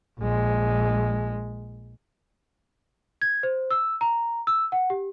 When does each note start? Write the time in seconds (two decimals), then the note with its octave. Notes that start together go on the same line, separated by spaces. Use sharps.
0.19 A#1 G#3
3.22 G#6
3.43 C5
3.71 E6
4.01 A#5
4.47 E6
4.72 F#5
4.90 G4